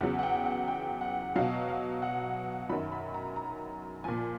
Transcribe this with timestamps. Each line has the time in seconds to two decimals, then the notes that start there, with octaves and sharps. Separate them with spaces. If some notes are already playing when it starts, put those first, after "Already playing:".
0.01 E2 C#3 F#3 F#5
0.19 F#5
0.23 G5
0.46 F#5
0.68 G5
1.01 F#5
1.36 B2 F#3 F5
1.69 F5
2.02 F#5
2.69 F#2 D#3 F#3 B5
2.92 B5
3.14 A#5
3.36 A#5
4.04 A#2 F3 G#5